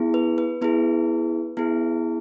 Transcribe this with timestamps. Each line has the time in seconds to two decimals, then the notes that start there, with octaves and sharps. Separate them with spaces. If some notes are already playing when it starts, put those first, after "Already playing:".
Already playing: B3 E4 G#4
0.14 B4
0.38 B4
0.61 B3 E4 G#4 B4
1.57 B3 E4 G#4